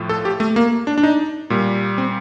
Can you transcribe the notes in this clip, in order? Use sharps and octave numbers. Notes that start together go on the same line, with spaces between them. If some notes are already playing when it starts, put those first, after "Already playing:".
Already playing: A2 F3 A3
A4
G4
A3
A#3
D4
D4
D#4
A#2 G3
C4